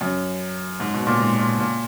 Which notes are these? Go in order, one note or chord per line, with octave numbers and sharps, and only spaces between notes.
F#2
G#2
B2
A#2
G#2
A#2
A#2